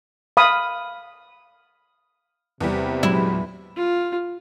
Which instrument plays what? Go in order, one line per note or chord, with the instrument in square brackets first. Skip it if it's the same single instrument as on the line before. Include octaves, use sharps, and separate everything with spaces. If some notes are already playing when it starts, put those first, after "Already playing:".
[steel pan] F5 B5 D#6
[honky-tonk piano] E2 G3 [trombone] C3
[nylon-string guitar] A#2 F#3 G#3 [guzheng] E4
[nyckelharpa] F4